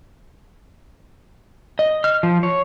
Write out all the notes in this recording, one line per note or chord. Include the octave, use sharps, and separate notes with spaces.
D#5
F6
F3
C#5